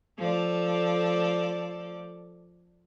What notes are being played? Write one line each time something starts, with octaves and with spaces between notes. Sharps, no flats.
F3 A4 D5